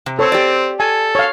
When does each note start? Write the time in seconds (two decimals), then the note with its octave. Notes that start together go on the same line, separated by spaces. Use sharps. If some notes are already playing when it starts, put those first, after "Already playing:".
0.06 C3
0.19 C4 A4 C#5
0.32 G4 D5
0.80 A4 G#5
1.15 C#5 F5